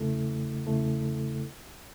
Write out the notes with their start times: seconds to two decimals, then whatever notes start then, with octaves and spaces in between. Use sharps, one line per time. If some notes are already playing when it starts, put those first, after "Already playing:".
Already playing: E2 C#3 A3 E4 A4
0.67 E2 C#3 A3 E4 A4